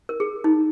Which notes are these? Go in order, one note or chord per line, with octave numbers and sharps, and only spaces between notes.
A#4
G#4
D#4